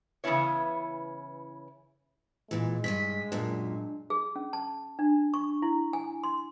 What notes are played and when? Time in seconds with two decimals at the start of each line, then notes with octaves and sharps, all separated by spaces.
0.24 C#3 E3 B3 C#4 E4 C#5
2.51 A#2 E3 G#3
2.84 G2 G#4 D#5 B6
3.32 F#2 A#2 D4
4.10 G#4
4.36 C#4
4.53 A5
4.99 D4
5.34 C#6
5.62 E4
5.93 G#5
6.24 C6